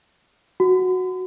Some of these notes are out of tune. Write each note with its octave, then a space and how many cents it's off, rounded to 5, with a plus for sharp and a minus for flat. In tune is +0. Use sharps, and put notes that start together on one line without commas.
F#4 -5